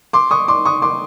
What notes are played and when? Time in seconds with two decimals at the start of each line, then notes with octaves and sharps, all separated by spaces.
0.13 C6 D6
0.31 C#6 D#6
0.48 C6 D6
0.65 C#6 D#6
0.82 C6 D6